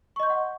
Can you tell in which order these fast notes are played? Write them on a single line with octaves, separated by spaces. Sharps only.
C#6 D#5 G6 C6 F#5